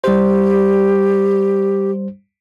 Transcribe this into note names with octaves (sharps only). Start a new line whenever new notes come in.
G3 G4 C5